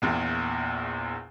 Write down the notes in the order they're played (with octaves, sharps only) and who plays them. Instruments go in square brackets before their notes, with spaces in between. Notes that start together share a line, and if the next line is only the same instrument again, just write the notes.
[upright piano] A#1 E2 A#2